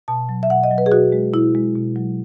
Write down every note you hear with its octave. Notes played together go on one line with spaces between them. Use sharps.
B2 A5
F#3
E5
B2 F#5
D#5
F#3
B4
G#4
B2 F#4
G#3
B2 E4
G#3
B2
F#3